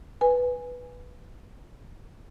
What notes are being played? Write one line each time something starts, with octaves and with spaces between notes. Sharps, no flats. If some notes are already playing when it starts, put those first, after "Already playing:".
B4 G#5